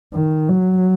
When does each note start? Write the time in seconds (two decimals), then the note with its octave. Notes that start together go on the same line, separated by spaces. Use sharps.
0.14 D#3
0.48 F#3